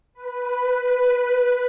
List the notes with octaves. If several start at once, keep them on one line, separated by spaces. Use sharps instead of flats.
B4